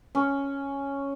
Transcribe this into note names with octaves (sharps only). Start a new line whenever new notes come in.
C#4